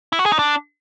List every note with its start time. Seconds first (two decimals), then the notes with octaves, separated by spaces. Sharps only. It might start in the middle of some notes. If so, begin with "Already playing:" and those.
0.13 E4
0.19 F#4
0.26 G#4
0.32 D#4
0.39 D4